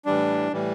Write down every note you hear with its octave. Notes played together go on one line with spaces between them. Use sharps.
A2 E3 G3 D4
A2 E3 G3